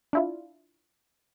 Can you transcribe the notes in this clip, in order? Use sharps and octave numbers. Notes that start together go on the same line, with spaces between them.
D4 E4 F4